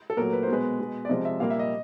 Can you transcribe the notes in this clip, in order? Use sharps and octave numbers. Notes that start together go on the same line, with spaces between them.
A4
A#2 F#3 A3 A#4
B4
B2 C5
G#3 B4
B2 G#3
D5
C3 F3 G#3 D#5
E5
A#2 G3 A#3 F5
E5
D#5